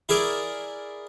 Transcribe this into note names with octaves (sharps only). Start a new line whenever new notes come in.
E4 G#4 A#4 D5